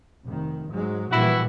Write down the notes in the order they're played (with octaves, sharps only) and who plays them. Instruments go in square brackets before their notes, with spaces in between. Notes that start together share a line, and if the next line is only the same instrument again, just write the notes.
[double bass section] F1 D#3
G#2 F#3 G#3
[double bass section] A#1 E3 G3 [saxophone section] E4 F#4